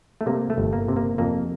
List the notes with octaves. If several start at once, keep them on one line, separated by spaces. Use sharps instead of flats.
A3
C3 A#3
A3
G1
A#3
C3
A#3
F2 A#3